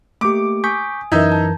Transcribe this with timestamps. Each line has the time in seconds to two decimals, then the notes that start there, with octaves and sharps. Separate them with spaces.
0.21 A3 A#3 G4 D6
0.64 G#5 C#6 D#6 G6 B6
1.12 F#2 E3 D#4 A#4 E5 A#5 G6 G#6
1.32 A5